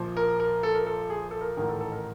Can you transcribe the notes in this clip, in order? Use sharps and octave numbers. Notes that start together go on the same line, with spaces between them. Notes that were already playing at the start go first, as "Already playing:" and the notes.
Already playing: A#1 A#2 F3
A#4
A#4
A4
A#4
A4
G#4
A4
A#4
A1 G#2 D#3 A#4
A4
A4
A#4